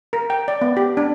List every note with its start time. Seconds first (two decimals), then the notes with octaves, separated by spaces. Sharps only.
0.13 A#4
0.30 G5
0.48 D5
0.61 B3
0.77 G4
0.97 D4